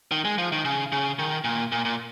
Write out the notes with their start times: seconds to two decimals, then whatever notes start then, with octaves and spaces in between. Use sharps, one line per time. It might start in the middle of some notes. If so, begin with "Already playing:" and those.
0.11 D#3
0.25 G#3
0.38 F3
0.52 D#3
0.65 C#3
0.92 C#3
1.19 D#3
1.44 A#2
1.72 A#2
1.85 A#2